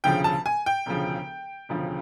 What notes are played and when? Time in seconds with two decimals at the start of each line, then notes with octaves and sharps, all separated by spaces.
0.04 E1 D2 C#3 F3 G5
0.24 A5
0.46 G#5
0.66 G5
0.86 E1 D2 C#3 F3
1.69 E1 D2 C#3 F3